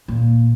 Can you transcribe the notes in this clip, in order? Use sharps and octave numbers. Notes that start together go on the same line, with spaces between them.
A#2